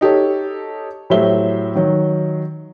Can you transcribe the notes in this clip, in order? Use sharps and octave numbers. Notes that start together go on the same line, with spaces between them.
D#4 G4 A4 C#5
A2 F#3 G4 C5 E5 G7
D#3 F#3